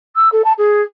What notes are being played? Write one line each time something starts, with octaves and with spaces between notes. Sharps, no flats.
E6
A4
A5
G#4